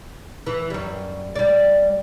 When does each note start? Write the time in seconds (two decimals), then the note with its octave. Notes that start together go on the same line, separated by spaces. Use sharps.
0.47 E3
0.70 F#2 G3
1.35 G3 D5